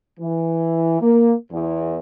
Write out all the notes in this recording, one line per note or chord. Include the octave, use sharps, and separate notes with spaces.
E3
A#3
E2